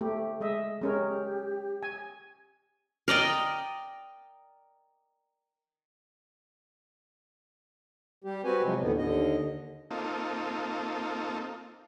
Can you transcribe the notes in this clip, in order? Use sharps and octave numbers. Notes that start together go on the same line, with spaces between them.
A3 G4
G#3 D#5 E5
G#3 C#4 G4 A#4
G#5
A#4 D5 D#5 G5
G3 G4
C4 F#4 G4 B4 G#5
C3 F3 F#3 G#3
D#2 A2 D3 B3
D#2 D3 D#5
A#3 C4 D#4 F4 A4